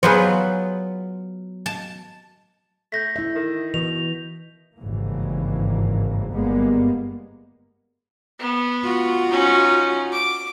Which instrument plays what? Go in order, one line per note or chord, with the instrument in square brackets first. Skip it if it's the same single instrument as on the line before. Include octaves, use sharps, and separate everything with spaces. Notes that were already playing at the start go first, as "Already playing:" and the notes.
[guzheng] F#3 B3 F4 [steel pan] G#4 B4 C5
[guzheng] A5
[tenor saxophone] A3 [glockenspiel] G6 A#6 B6
[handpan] E4 E5
[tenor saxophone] D#3
[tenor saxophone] B2 [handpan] E3 [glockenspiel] F7
[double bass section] G#1 G2 C#3 E3 A#3
G1 G3 G#3 A#3 B3
[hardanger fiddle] B3
[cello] F4 F#4
[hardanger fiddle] C#4 D#4
D6